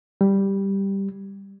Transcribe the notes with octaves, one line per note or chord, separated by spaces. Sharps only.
G3